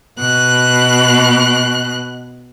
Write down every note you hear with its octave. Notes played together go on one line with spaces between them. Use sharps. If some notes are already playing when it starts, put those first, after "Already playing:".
B2 F#6